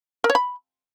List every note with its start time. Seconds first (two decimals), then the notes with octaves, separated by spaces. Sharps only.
0.24 A#4
0.30 C#5
0.35 B5